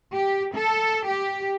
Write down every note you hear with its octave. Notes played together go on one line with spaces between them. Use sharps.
G4
A4
G4